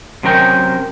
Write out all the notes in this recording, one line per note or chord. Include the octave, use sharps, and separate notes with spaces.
C3 F#3 C#4 A#4 G5